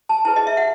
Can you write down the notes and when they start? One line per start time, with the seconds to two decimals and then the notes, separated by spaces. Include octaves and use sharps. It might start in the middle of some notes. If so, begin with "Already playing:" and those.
0.09 A5
0.25 E4 G#4 B4 A5
0.36 D#5
0.47 E5
0.57 F#5